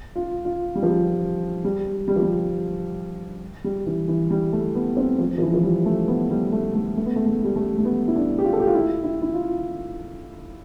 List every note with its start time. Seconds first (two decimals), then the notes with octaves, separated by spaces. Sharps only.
0.16 F4
0.45 F4
0.75 G3
0.83 F3
0.89 G3
1.64 G3
2.08 G3
2.16 F3
2.22 G3
3.64 G3
3.86 E3
4.08 E3
4.31 G3
4.53 A3
4.75 B3
4.97 C4
5.19 F3
5.38 F3
5.42 E3
5.53 F3
5.64 G3
5.86 A3
6.08 B3
6.30 G3
6.52 A3
6.75 A3
6.97 A3
7.06 B3
7.16 A3
7.26 A3
7.44 G3
7.56 A3
7.78 A3
7.85 B3
8.08 E4
8.16 D4
8.39 G4
8.45 F4
8.53 A4
8.60 G4
8.67 F4
8.75 E4
9.04 E4
9.22 E4
9.34 F4